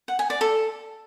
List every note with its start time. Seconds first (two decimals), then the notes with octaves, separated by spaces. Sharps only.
0.08 F#5
0.19 G#5
0.30 D5
0.41 A4